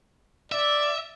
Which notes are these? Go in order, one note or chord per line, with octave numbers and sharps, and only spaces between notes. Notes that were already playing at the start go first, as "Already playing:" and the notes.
D5 E5